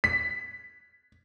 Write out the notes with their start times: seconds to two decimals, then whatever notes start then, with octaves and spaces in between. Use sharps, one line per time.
0.04 B6